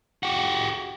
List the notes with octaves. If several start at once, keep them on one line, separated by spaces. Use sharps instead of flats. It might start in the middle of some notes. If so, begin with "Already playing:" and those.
F#4 G4